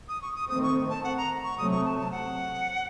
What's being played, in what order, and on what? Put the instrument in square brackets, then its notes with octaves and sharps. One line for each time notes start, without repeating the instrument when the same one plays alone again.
[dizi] D#6
C#6
D#6
[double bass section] D#3 A3 C4 [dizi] D#6
[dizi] C#6
A5
F#5
A#5
C#6
[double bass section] C3 F#3 A3 C4 [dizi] D#6
[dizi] C#6
A5
A5
F#5